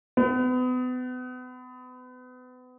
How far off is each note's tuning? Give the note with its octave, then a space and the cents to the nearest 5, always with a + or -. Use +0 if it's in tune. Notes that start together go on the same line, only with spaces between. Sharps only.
B3 +35